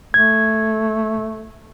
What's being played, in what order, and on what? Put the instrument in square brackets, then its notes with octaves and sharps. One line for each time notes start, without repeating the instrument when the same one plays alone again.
[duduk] A3 [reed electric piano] G#6